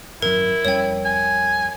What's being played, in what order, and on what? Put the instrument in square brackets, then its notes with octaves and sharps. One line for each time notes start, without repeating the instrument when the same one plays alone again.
[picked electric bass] G#1 F#2 F#3 [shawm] E4 [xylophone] A#4
[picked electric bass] F2 G3 C#4 [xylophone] C#5 G5
[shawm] G#5